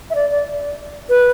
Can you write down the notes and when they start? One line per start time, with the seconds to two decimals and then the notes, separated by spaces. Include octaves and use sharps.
0.10 E5
0.15 D5
0.31 D5
1.09 B4